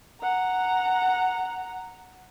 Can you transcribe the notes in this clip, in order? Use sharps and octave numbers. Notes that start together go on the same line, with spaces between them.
F#5 A#5